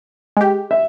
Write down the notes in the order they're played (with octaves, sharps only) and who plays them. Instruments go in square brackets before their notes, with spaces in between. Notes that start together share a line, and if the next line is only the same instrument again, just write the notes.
[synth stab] G#3 G4
[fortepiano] E5